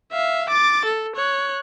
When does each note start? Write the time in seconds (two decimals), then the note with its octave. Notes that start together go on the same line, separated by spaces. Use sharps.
0.12 E5 F5
0.50 D6 A6
0.85 A4
1.16 C#5 F#6